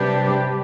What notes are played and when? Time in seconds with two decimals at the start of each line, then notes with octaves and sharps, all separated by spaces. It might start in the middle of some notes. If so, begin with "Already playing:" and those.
Already playing: C3 G3 D4 G4 B4